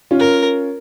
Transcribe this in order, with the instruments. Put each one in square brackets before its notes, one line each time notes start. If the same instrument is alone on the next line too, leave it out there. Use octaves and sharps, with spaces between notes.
[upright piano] C#4 F4
[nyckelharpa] A#4